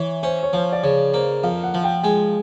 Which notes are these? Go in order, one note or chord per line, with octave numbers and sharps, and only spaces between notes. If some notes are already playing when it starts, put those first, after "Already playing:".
Already playing: E3 C#5
C#4 C5
C#5
F3 C5
D5
C#3 C#5
A#3 C5
F2 F5
F#5
F3
G5
G#3 G#5